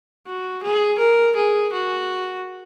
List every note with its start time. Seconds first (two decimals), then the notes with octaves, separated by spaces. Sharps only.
0.26 F#4
0.63 G#4
0.99 A#4
1.36 G#4
1.73 F#4